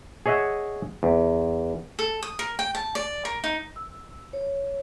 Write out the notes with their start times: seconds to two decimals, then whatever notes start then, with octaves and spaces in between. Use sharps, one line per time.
0.26 G#4 C#5 D#5 E5 F#5
1.03 E2
1.99 A4
2.23 D#6
2.39 A#4
2.59 G5
2.75 A5
2.95 D5
3.25 A#4
3.44 D#4
3.76 E6
4.33 C#5